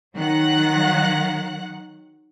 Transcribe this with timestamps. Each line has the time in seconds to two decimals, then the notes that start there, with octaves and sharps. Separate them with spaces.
0.16 D#3 F#3 F#5 F#6